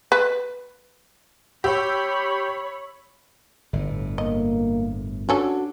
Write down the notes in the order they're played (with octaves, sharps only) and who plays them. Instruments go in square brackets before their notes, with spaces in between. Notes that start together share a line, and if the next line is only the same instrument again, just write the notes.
[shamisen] B4
[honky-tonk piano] G4 E6 [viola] C#5 B5
[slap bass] G1 A2
[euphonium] A#3 [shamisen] D#5
[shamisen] G3 C#4 A4 [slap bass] D4 [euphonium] F#4